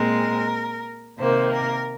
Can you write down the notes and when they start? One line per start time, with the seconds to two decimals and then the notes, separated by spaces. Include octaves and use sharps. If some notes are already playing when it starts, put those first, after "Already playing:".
Already playing: A#2 G#3 C4 A#4
1.19 C3 D#3 A#3 C5
1.52 A#4